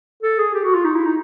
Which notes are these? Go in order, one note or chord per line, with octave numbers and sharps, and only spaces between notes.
A4
G#4
G4
F#4
F4
D#4
E4
D#4